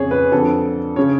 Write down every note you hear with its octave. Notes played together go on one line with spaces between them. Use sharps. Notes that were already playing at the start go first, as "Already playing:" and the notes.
Already playing: F2 C#3 G#4 C#5
B4
F2 D3 A4
C#3 C#5